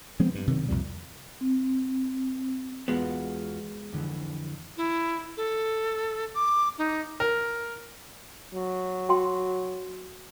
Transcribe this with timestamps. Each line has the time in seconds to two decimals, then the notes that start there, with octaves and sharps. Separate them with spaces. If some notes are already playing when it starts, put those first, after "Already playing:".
0.19 F3 G#3 B3 C4
0.35 G2
0.47 C3 D#3 F#3
0.69 C2 F2 A#2 G3
1.41 C4
2.88 E2 G#3 B3 F4 F#4
3.92 F2 D3 E3
4.77 E4
5.37 A4
6.35 D6
6.78 D#4
7.20 A#4
8.54 F#3
9.09 F#4 G5 C6